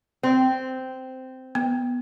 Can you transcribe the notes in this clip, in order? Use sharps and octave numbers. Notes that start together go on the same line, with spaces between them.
C4
B3